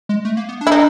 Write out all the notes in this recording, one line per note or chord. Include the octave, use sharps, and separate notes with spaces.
G#3
A3
A#3
B3
D4
E4
D#4